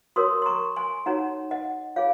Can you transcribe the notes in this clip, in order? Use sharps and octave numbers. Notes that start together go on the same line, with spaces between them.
F#4 A#4 C#5 C6 D#6
C6
A#5 C#6
G#5 C6
D#4 F#4 C#5 F#5 A#5
D#5 F#5
F4 G#4 C#5 F5